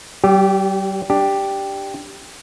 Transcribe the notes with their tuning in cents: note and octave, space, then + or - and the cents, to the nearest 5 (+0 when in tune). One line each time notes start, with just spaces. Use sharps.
G3 -40 G4 +0
D4 +0 G4 +0